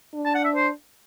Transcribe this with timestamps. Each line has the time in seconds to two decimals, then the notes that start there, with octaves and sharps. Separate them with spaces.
0.14 D4
0.25 A5
0.35 F#5
0.45 E5
0.56 C5